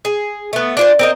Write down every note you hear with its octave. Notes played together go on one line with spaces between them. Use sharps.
G#4
A3 B3
D4 F4 C5
C4 A#4 D#5